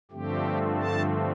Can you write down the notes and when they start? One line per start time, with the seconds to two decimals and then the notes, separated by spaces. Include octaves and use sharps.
0.11 G2 D3 F3 A3 C4 G4
0.79 A5